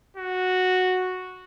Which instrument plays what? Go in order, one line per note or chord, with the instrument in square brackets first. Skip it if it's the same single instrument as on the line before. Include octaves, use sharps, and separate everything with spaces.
[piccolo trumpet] F#4